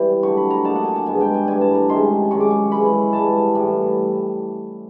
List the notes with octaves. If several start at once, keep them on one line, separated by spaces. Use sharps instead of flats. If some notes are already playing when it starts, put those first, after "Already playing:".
Already playing: E3 G3 C4
D3 F#3 A3 C#6
B5
A#5
D3 F#3 A#3 D#4 A5
F#5
G#5
A5
G2 D#3 G#3 B3 G#5
G5
G#5
G2 E3 A3 D4 G#5
A5
A#5
C3 D#3 G#3 C#4 C6
F#2 D#3 G#3 C#4 C#6
D6
C#6
E3 G#3 C#4 E4 B5
G#2 E3 G3 A5
A2 E3 G3